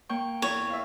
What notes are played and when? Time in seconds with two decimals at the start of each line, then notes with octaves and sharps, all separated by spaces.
0.09 A#3 G5 C#6
0.42 E2 C#5
0.70 E5 F5